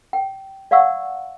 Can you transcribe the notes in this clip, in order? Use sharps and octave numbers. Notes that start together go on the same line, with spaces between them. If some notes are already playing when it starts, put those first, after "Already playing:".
G5
D5 F5 F#5 C#6 E6